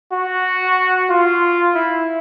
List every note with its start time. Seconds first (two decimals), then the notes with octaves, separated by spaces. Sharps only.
0.12 F#4
1.10 F4
1.74 E4